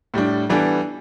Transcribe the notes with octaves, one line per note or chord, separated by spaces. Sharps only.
A2 G3 D4
E3 G3 B3 D4 A4